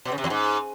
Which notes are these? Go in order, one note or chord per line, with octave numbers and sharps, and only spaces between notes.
B2
C#3
C3
E2
G#2